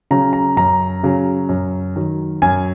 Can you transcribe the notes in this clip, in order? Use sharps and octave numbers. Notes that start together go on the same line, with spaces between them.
C#3 F#3 C#4 A#5
A#5
F#2 A#5
C#3 F#3 C#4
F#2
D#3 F#3
F#2 G#5